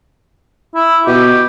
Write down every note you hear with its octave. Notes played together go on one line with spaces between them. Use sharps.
E4
B2 G4